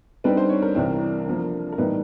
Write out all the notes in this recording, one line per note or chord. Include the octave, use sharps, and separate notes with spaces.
D3 G3 C4 D#4 B4
C5
C#5
A#4
C2 C3 E3 G3 C4
D3 F3 A#3
A#4
A2 E3 G3 A#3 D#4 B4